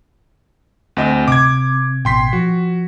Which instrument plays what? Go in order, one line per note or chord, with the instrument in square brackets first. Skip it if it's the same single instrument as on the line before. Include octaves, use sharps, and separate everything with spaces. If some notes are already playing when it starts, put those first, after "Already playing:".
[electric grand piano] D2 C4 D#5
[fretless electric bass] C3 [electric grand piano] D6 G#6
[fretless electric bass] A1 B2 [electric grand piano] G5 C6 B6
[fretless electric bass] F3 [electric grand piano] F#4